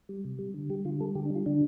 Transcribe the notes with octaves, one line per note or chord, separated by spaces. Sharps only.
G3
C3
G3
D3
G3 G4
D3 F4
G3 A4
D3 G4
D4
G3 F4
D3 D4